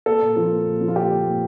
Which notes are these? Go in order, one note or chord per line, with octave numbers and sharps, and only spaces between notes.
A#3 A4
A#2
F3
A#3
A#2
F3
F4
A#2 G4
A#2
A#2